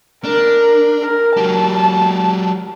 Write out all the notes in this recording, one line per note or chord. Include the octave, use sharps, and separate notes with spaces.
D4 A#4
A#4
F#3 G4 A5